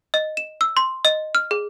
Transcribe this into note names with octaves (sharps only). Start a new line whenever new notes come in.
D#5
E7
E6
C6
D#5
F6
G#4